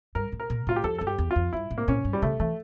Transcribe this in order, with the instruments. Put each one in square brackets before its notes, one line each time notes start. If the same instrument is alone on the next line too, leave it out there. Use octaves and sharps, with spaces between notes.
[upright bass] G2 [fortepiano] A#4
[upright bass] A2
[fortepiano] A#4
[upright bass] A#2
[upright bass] A2 [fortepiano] F4
[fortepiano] G4
[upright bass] F2 [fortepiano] A4
[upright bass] G2 [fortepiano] A4
[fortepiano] G4
[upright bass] E2
[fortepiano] F4
[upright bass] F2
[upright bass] G2 [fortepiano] E4
[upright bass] A2
[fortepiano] A#3
[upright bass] A#2 [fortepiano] C#4
[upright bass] G2
[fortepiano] G3
[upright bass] C#3 [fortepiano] A3
[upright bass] E3 [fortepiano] A3